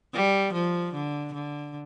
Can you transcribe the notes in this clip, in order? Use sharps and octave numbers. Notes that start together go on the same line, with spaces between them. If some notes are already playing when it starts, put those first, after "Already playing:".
G3
F3
D3
D3